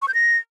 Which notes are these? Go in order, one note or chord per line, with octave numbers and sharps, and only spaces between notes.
C#6
G6
A#6